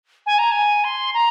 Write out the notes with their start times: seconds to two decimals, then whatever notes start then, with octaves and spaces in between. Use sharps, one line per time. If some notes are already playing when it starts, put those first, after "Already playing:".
0.26 G#5
0.39 A#5
0.51 G#5
0.84 C6
1.14 A#5